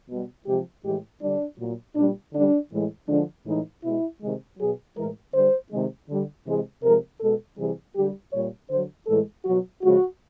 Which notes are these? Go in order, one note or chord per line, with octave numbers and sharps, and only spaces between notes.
B2 G3
C3 F3 G#3 G4
A2 E3 G#3 G4
D3 G3 D4
A#2 F#3
A#2 G3 D4
D3 G3 D4
A2 E3 G#3
D3 F3 G#3 D4
A2 E3 G#3 D#4
B2 G#3 E4
C3 D#3 G#3
B2 F#3 G#4
A2 E3 G#3 A#4
D3 G3 C5
C3 D#3 G#3
D3 G3
C3 E3 G#3
C3 F3 G#3 A#4
B2 G#3 A4
C3 E3 G3 G#4
D3 G3 G4
A#2 G3 C#5
D3 F#3 C5
A2 E3 G#3 A4
B2 F#3 F#4
C#3 F3 G#3 F#4